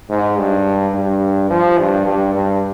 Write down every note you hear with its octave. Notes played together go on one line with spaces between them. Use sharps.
G#2
G2
G2
F3
G2
G2
G2